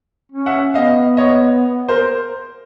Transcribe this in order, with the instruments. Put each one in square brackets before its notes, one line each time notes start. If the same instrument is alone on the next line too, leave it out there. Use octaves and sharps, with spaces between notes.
[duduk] C#4
[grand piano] E5 F#5
[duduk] B3 [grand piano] D#5 F5
[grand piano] C#5 D#5
A#4 C5